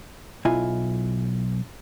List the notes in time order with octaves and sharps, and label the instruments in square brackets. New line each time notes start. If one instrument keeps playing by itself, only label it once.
[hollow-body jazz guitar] B1 E4 F4 E5 G#5